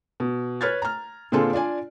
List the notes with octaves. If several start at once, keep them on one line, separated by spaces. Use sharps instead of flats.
B2
B4 C#5 F6 G#6 A6
A#5 F6
A#2 D3 C4 F4 G#4 A4
D4 F4 D5 G#5